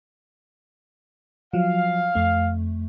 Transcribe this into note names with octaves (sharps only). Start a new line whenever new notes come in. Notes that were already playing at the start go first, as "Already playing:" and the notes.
F3 F#3 F5
F2 A3